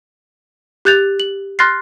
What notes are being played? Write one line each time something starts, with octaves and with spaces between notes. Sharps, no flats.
G4 F#6 G6 A6 F7
F#7
C6 F6 F#6 A6 A#6 C7